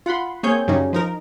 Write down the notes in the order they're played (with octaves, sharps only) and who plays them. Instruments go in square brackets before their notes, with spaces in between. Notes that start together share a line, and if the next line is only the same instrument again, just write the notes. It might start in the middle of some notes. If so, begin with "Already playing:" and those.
[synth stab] F4 F#5 B5 C6
A#3 C4 G#4 C#5 G6
F#2 C#3 F#3 G3 C#4 D#4
F3 D#4 A#4